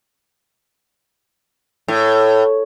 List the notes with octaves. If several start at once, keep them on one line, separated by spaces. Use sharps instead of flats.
A2 C#5